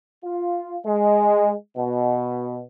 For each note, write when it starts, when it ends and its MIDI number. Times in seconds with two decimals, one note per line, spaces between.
0.24 0.76 65
0.86 1.53 56
1.77 2.61 47